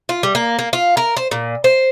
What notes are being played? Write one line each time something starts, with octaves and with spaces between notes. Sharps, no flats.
F4
G3
A#3
A#3
F4
A#4
C5
A#2
C5